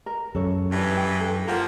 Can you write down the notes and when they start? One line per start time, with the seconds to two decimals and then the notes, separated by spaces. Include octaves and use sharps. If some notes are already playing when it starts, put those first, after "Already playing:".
0.06 A#4
0.35 F#2 A4 C#5
0.72 G2 E3
0.97 G5
1.20 A4
1.47 F3 A#3 A#4 F#5 A5